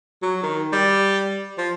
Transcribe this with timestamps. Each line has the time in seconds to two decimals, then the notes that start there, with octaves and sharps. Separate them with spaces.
0.22 F#3
0.43 D#3
0.72 G3
1.58 F3